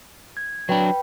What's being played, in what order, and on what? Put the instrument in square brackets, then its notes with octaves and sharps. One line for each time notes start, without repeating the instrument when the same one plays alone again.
[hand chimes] G#6
[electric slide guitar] F#3 D4 [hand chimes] B4 G5 B5